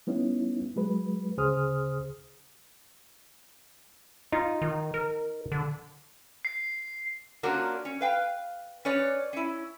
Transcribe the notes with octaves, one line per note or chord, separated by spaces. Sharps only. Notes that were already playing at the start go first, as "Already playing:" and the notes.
G3 B3 C#4 D#4 E4
F#3 G#3 B4
D2 C#3 G#4 C5 D#6 F6
D#4 F4
D#3
A#4
D3
C7
A#3 C#4 D4 F4 F#4 A#4
C#4
B4 F5 G5
C#4 B4 C#5 D5
C#4 E4